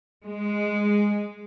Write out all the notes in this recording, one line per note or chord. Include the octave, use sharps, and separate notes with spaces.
G#3